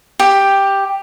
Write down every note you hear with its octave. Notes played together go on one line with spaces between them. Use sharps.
G4